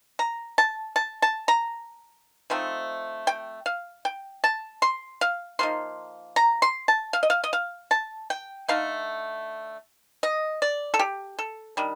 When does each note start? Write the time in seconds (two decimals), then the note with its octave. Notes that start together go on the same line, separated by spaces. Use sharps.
0.19 A#5
0.58 A5
0.96 A5
1.22 A5
1.48 A#5
2.50 F3 A3 C4 D#4
3.27 G5
3.66 F5
4.05 G5
4.44 A5
4.82 C6
5.21 F5
5.59 F3 A#3 D#4 C6
6.36 A#5
6.62 C6
6.88 A5
7.13 F5
7.23 D#5
7.30 F5
7.44 D#5
7.53 F5
7.91 A5
8.30 G5
8.69 D3 A3 D#4 F5
10.23 D#5
10.62 D5
10.94 A4
10.99 G4
11.39 A4
11.77 D#3 G3 D4